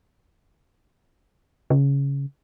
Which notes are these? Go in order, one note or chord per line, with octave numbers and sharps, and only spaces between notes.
C#3